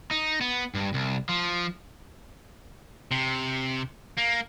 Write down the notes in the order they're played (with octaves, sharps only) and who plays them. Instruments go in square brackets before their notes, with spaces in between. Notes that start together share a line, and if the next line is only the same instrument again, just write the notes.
[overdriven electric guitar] D#4
B3
G2
C2
F3
[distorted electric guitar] C3
A#3